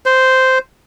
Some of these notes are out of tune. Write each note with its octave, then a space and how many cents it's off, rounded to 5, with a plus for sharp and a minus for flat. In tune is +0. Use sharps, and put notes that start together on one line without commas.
C5 -10